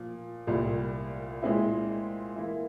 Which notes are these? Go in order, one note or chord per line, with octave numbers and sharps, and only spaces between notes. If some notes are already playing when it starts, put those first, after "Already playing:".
Already playing: A#2 F3
C2 A#2 G3
A#2 G#3 C4 E4
E3 A#3 E4